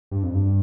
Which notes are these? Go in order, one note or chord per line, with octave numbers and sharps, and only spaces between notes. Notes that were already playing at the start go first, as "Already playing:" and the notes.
G2
F2
G2